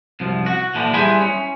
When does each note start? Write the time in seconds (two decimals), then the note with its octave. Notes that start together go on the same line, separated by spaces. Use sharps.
0.20 C2 F#2 F3
0.46 F#4
0.75 A#2 D3 E3 F3 D4
0.94 G3 E4 G#4 B4 C5
1.21 C#4